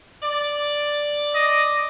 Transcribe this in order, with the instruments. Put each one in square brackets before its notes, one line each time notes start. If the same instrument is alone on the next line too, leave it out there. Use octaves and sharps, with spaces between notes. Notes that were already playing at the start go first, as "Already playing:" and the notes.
[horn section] D5
[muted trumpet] D#5